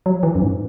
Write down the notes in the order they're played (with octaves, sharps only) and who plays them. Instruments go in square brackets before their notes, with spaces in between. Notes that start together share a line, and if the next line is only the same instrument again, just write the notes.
[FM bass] F#3
E3
F#2
G#2